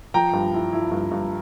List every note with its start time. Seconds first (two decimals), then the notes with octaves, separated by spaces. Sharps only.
0.14 F3 G5 A#5
0.33 G2
0.54 E4
0.73 E4
0.92 G2
1.11 G2